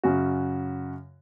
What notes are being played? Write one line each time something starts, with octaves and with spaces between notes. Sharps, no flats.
F#2 C#3 F#4